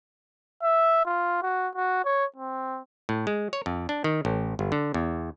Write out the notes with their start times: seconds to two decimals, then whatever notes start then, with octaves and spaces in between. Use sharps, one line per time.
0.63 E5
1.05 F4
1.42 F#4
1.75 F#4
2.05 C#5
2.36 C4
3.09 A2
3.27 G#3
3.53 C#5
3.66 F2
3.89 D4
4.04 D#3
4.25 A1
4.59 G1
4.72 D3
4.94 E2